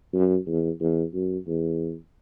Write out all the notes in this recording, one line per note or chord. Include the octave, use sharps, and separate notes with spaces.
F#2
E2
E2
F#2
E2